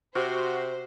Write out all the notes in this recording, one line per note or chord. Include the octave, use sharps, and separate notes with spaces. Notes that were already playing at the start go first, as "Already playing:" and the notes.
C3 F#4 C5